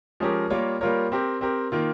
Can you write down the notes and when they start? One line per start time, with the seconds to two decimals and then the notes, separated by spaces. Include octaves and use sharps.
0.20 F3 G#3 C#4 G4 A#4
0.50 G3 A#3 F4 A#4 C#5
0.81 G3 A#3 F4 A#4 C#5
1.12 C4 G4 A#4
1.41 C4 G4 A#4
1.72 D#3 A#3 F4